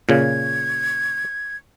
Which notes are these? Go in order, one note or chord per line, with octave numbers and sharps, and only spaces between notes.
A#2 C#3 G#6